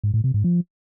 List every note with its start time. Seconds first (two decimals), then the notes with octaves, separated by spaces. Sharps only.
0.04 G#2
0.14 A2
0.24 C3
0.34 G#2
0.44 F3